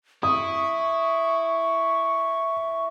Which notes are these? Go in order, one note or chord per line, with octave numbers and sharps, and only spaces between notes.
E4 C#6 D#6